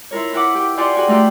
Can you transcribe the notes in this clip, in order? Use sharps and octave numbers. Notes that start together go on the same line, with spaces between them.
E4 F4 A#4 C#5
E4 B4 F#5 D6
G4
F4 G4 D5 F#5 G#5 C6
F#4 G#4 G5
A3 D#4 F4 G4 B4